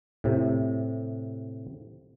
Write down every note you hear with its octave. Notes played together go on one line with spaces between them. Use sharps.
A2 C3